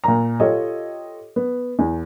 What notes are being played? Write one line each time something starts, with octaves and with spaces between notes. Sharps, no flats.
A#2 A#5
F4 G4 A4 C#5 D#5
B3
E2